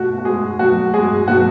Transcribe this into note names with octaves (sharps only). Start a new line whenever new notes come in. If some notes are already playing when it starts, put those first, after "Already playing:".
Already playing: B2 A3 F#4
F#4
G#3 G#4
B2 F#3 A3 F#4
G#3 G#4
B2 F#3 A3 F#4